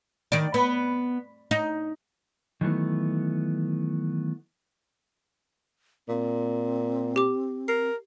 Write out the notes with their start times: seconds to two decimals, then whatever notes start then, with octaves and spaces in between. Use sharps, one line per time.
0.32 D#3 D5
0.54 B3
1.51 D#4
2.61 D#3 E3 F#3 A3 B3
6.08 A#2 C4
7.16 G4 D6
7.68 A#4 C7